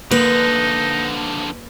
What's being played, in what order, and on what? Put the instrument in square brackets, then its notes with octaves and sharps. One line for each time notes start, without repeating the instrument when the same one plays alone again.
[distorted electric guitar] D3 F3 [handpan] A#3 [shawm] D#4 [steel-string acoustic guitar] B4